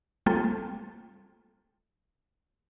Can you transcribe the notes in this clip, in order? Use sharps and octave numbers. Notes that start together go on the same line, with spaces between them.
G3 A3 A#3 C4 F4 A4